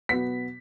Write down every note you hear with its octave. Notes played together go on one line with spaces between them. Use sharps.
B2 F#3 B3 B6